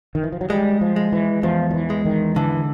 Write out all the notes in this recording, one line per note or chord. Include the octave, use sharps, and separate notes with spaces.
D#3
E3
F3
F#3
G3 G#3
F3
G#3
E3
E2 F3
F3
E3
G#3
D#3
D3 E3